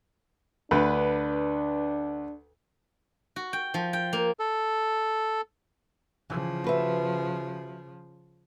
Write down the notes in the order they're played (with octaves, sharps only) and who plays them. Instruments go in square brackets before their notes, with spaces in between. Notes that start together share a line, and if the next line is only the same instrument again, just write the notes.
[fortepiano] D2 [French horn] D4 [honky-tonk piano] B4
[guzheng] F#4
G5
F3
G5
A#3
[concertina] A4
[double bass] C#3 F3 [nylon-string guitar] E3
[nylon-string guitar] F#4 B4 E5